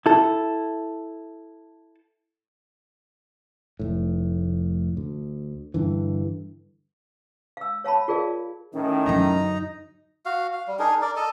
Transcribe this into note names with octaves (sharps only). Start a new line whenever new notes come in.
E4 A4
F1 A2
D2
G2 D3 E3
F5 E6
C#5 F5 A5 B5
F4 G#4 A#4 D5 F5
A2 D#3 C#4
F#2 D3 D#4 A#5
F#4 F5
F5
G3
D4 D#4 G#4 A#4
A#4 D5
A4 D#5 A5